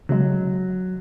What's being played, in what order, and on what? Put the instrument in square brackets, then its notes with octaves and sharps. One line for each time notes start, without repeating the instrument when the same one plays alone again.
[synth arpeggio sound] C#3 G#3 [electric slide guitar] F#3